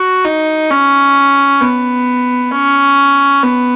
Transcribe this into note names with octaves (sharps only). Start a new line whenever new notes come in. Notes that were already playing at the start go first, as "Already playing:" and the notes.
Already playing: F#4
D#4
C#4
B3
C#4
B3